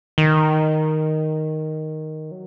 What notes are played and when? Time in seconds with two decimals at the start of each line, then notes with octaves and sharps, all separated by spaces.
0.18 D#3
2.31 F#3